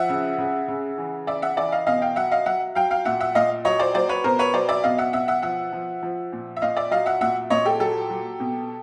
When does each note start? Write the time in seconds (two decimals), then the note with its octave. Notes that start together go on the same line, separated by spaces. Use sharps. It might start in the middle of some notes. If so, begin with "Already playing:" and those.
Already playing: F3 E5 F#5
0.09 C#3
0.38 C#3
0.68 C#3
0.98 E3
1.27 C#3 D5 E5
1.42 E5 F#5
1.57 E3 D5 E5
1.72 D#5 F5
1.87 B2 D#5 F5
2.02 F5 G5
2.16 F#3 E5 F#5
2.31 D#5 F5
2.46 F#3 E5 F#5
2.75 F#3 F5 G5
2.91 F5 G5
3.05 A#2 E5 F#5
3.20 E5 F#5
3.35 A#2 D#5 F5
3.65 F#3 C#5 D#5
3.79 C5 D5
3.94 F#3 C5 D5
4.09 B4 C#5
4.24 B2 A#4 C5
4.39 B4 C#5
4.53 F#3 C5 D5
4.69 D5 E5
4.83 B2 D#5 F5
4.98 E5 F#5
5.13 B2 E5 F#5
5.28 E5 F#5
5.42 F3 E5 F#5
5.72 F3
6.03 F3
6.32 A#2
6.56 E5
6.62 A#2 D#5 F5
6.76 D5 E5
6.91 F#3 D#5 F5
7.06 E5 F#5
7.21 A#2 E5 F#5
7.50 A#2 C#5 D#5
7.65 G4 A4
7.80 F#3 G4 A4
8.10 F#3
8.40 B2